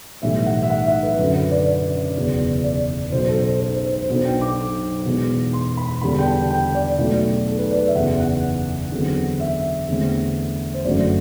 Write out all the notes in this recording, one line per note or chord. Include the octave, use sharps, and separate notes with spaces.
B1 A2 E3 G3 E5
F#5
E5
F#5
E5
B4
F#2 D3 F#3
B4
D5
F#1 E2 B2
D5
B1 B2 F#3 C5
A4
C5
C5
C5
C5
B1 B2 F#3 B3 D4 C5
G5
D6
E1 E2 B2
C6
B5
E2 D3 G3 D4 B5
G5
A5
G5
D5
B1 B2 F#3 A3 D5
A4
B4
D5
E5
F#1 E2 B2 F#5
F#5
E2 D3 F#3 C4
E5
E2 D3 A3 C4
C5
G1 F#2 D3 F#3 A3 D5